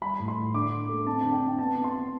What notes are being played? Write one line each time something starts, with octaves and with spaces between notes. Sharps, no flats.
G3 B5
A2
C6
A2
D3 D6
D3
A3
C4 A5
D3 A5
G5
C4
G5
B3 A5
B3
C6
B3